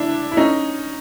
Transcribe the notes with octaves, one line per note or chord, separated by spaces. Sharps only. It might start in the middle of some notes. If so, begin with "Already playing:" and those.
Already playing: D4 E4
E4
C#4 D#4